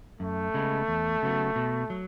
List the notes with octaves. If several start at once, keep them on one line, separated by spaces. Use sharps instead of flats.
F#2 A3
C#3 G#3 B3
E2
C#3 F#3 B3 F#4
B2
F#3